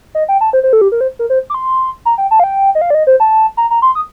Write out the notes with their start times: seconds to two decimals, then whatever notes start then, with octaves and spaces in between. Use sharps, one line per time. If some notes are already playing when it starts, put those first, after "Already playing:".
0.15 D#5
0.29 G5
0.41 A5
0.53 C5
0.63 C5
0.73 A4
0.81 G4
0.92 A#4
1.01 C5
1.19 A#4
1.30 C5
1.50 D6
1.54 C6
2.05 A#5
2.18 G5
2.31 A5
2.40 F5
2.44 G5
2.75 D#5
2.81 F5
2.90 D5
2.95 D#5
3.07 C5
3.20 A5
3.57 A#5
3.71 A#5
3.82 C6
3.95 D#6